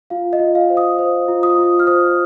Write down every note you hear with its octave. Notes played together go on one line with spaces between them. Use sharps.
F4 F5
D#5
F4
F5
C5
D#6
C5
F4
D#6
F4
F6
C5 D#6